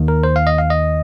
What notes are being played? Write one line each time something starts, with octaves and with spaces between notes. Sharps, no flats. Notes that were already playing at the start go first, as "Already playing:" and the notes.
Already playing: D#2 D#3
A#4
C5
F5
D#5
F5
D#5